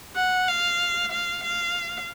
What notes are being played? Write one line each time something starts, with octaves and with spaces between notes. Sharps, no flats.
F#5
F5
F5
F5